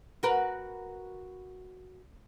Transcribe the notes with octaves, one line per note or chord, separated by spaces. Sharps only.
F#4 A#4 B4